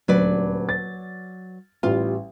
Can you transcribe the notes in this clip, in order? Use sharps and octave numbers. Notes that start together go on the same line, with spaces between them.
D#1 D2 F#3 B4 D5
A6
A1 G3 F4